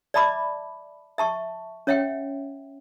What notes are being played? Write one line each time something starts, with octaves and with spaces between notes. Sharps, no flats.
D5 E5 A5 B5 D6
E5 A5 C#6
C#4 C#5 E5 F#5 G5